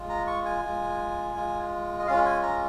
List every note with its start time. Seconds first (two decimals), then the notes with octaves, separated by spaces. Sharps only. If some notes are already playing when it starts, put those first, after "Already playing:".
Already playing: G#3 F4
0.09 A#5
0.27 C#6
0.45 G#5
0.62 G#3 F4
1.36 G#3 F4
1.99 D#5
2.07 G#3 C#4 F4 F5
2.26 G#5
2.43 A#5